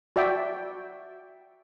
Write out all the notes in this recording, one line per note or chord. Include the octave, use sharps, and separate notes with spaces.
F#4 D5 E5 G5